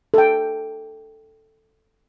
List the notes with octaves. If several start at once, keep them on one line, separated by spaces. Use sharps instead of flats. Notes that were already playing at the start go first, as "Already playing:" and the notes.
A4 G5